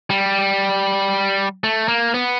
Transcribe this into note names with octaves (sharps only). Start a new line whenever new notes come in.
G3
A3
A#3
B3